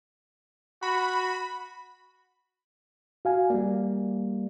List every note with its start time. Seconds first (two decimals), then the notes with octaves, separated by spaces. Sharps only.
0.83 F#4 B5
3.25 F#4 F5 G#5
3.50 G3 A#3 D5